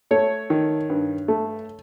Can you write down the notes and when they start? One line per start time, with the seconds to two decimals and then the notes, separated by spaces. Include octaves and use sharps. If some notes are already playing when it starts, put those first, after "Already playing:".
0.11 A3 C#5
0.50 D#3
0.90 G2
1.28 A3